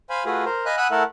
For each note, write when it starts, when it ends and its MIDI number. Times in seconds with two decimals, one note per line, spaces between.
0.10 0.24 72
0.10 0.24 77
0.10 0.24 80
0.10 0.24 83
0.25 0.44 57
0.25 0.44 65
0.25 0.44 66
0.25 0.44 68
0.25 0.44 71
0.45 0.65 70
0.45 0.65 72
0.66 0.76 75
0.66 0.76 77
0.66 0.76 80
0.66 0.76 83
0.66 0.76 90
0.77 0.88 78
0.77 0.88 80
0.77 0.88 83
0.77 0.88 87
0.77 0.88 88
0.77 0.88 90
0.91 1.03 57
0.91 1.03 64
0.91 1.03 69
0.91 1.03 70
0.91 1.03 76
0.91 1.03 78